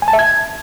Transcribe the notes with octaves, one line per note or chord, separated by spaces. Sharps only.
G#5
A5
E5
G#6